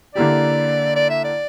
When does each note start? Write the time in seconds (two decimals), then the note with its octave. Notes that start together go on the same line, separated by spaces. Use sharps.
0.15 D3 A#3 E4 G4 D5
0.96 D5
1.10 E5
1.24 D5